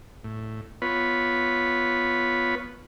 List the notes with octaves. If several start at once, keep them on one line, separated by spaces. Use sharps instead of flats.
A2
B3 F4 B4 C#5 B5